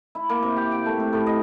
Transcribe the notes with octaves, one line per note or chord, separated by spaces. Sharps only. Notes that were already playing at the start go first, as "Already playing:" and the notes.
E4
A#3
C3
G4
G5
A3
C3
A2
D#5